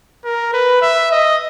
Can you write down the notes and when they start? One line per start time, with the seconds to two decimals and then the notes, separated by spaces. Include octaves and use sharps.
0.25 A#4
0.53 B4
0.82 E5
1.11 D#5